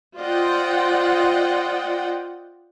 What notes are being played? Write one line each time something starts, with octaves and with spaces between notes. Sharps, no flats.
F4 C5 D5 D#5 F#5 G5